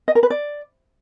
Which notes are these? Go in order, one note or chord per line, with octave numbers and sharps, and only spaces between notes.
D#5
A#4
B4
D5